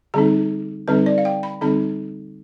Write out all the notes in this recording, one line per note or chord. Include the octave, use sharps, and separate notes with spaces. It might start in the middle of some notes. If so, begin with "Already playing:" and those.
D3 G3 C4 D#4 G#4
D3 G3 C4 D#4 B4
D5
F5
G5
B5
D3 G3 C4 D#4 B5